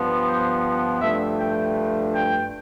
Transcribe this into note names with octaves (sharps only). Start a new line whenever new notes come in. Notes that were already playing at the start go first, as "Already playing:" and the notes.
Already playing: G2 F3 B3
C5
G2 F3 A3 D4 E5
G5
G5